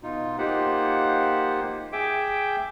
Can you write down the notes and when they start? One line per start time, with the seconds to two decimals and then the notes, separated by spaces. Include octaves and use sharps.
0.03 B2 D#4 F4
0.38 A#3 D#4 F4 G4 C5 F#5
1.93 G#4 E5 G5 D6